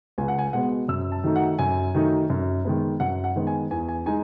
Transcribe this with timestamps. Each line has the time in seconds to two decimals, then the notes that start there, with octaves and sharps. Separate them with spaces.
0.18 C#2 G#5
0.28 F#5
0.39 G#5
0.53 B2 G#3 B3 F#5
0.88 F#2 E6
1.12 A5
1.24 D#3 F#3 A3 D#4
1.36 F#5
1.59 F#2 G#5
1.95 D#3 F#3 A3 D#4
2.30 F#2
2.65 D#3 G#3 B3
3.00 F#2 F#5
3.24 F#5
3.36 D#3 G#3 B3
3.47 G#5
3.71 E2 G#5
3.88 G#5
4.06 G#3 D#4 G#5